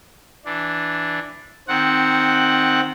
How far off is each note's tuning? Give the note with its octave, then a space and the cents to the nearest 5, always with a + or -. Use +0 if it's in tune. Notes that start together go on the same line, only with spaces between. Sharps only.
E3 +0 D4 +0
D#3 +0 C4 +0 F#5 +0